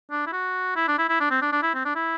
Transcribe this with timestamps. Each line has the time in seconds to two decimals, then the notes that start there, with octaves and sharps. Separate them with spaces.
0.11 D4
0.27 E4
0.33 F#4
0.76 E4
0.88 D4
0.98 E4
1.09 E4
1.20 D4
1.31 C4
1.41 D4
1.52 D4
1.62 E4
1.74 C4
1.85 D4
1.95 E4